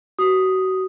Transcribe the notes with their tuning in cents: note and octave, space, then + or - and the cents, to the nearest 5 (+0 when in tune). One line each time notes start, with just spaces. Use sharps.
F#4 +30 D#6 +0